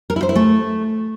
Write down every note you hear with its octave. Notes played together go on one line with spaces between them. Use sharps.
A#4
E4
C5
E4
A3